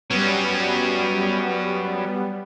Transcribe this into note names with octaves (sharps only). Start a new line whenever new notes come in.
F#3 G3 B3 C#4